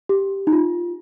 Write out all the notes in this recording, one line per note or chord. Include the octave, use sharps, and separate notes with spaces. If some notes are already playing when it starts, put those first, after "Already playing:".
G4
D#4
F4